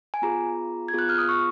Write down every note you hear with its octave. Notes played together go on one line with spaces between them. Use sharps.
G#5
B3 F4 G#4 A#5
G#6
B3 F4 G#4 F#6
F6
D#6
C#6